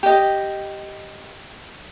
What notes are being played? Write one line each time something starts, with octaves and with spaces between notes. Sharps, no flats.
G4 D#5